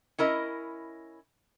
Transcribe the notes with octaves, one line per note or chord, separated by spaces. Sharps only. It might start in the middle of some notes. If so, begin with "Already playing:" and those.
C#4 E4 A#4 D#5